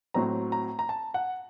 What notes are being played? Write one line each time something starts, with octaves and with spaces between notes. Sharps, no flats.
A2 F#3 C4 A#5
A#5
A#5
A5
F#5